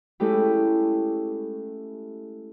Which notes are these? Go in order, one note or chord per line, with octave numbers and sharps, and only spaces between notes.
G#3 A3 C#4 E4 G4